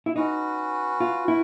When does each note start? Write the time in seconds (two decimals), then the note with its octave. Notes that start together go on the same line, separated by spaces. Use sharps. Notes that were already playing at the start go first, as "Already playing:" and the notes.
0.06 E4
0.16 C#4 D#4 F#4 B4
1.00 F4
1.28 E4